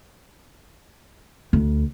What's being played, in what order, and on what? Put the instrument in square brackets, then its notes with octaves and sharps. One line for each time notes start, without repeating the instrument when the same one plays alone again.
[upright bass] D2